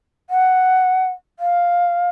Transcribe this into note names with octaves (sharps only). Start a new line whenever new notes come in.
F#5
F5